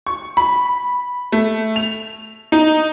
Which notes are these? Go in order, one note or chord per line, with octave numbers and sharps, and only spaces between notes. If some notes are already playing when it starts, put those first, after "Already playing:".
C#6
B5
A3
F7
D#4